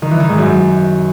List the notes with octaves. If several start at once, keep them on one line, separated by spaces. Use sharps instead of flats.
D#3
E3
D#3
G#2
F#2